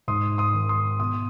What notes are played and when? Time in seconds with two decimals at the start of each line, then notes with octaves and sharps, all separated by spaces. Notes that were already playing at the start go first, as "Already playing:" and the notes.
0.08 G#2 C6 D#6
0.38 C6 D#6
0.54 D#3
0.69 C6 D#6
0.99 B2 C6 D#6